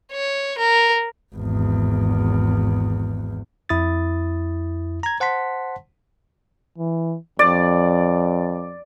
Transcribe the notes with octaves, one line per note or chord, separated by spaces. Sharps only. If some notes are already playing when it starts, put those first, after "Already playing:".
C#5
A#4
G#1 E2
F2 E4 D#6 A6
A#5 G#6
C5 F#5 A5 C6 B6
E3
F2 D5